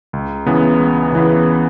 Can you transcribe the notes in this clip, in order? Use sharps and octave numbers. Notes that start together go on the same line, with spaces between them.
C#2
C#3 E3 B3
C#2
C#3 E3 B3